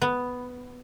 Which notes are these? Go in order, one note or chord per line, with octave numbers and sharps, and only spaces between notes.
B3